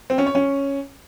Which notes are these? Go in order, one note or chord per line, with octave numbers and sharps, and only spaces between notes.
C4
C#4
C#5
C#4